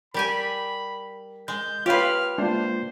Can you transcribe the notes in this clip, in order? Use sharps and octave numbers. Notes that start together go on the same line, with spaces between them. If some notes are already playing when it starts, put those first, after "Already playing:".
G3 G4 A#4 G#5 B5
G#3 G6
F4 G4 B4 C#5 F5 F6
G#3 A#3 D4 F4 C5